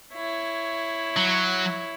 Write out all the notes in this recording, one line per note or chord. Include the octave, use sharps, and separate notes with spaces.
E4 C#5
F#3